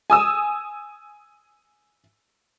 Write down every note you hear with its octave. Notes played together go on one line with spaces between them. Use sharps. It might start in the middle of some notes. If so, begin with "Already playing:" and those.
G#5 D#6 E6